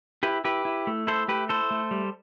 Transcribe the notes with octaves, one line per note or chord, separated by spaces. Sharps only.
E4 G4 B4
E4 G4 B4
E4
A3
E4 A4 C5
A3 G4 B4
E4 A4 C5
A3
G3